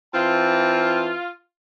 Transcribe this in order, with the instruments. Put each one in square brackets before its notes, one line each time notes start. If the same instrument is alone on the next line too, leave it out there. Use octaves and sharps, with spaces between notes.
[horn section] E3 C4 A5 [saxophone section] F4